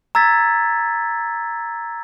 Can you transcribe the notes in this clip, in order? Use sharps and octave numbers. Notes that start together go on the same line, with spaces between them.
A#5 E6 G#6 A6 B6